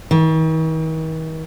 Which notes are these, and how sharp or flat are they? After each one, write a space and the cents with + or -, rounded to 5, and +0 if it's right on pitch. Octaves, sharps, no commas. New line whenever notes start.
D#3 +45